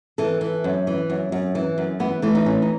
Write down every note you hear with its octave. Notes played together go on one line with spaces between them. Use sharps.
E3 A4
E3
F#2
E3
F#2
F#2
E3
F#2
E3 B3
E3 A3
D#4
A2 C#4
D#4